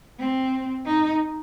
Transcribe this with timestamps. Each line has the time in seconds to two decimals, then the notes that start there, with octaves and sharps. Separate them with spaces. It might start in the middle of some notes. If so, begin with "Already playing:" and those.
0.19 C4
0.85 D#4